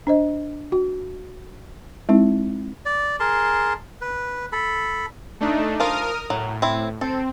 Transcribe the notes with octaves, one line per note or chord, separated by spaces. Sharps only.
D4 C5 D#5
F#4
G#3 C4 D#4 E4
D5
G#4 A#4 A5 C6
B4
A4 B5
A3 D4 D#4
F3 F4 A#4 D#6 F6
A2 F#3
C4 E4
C4 A4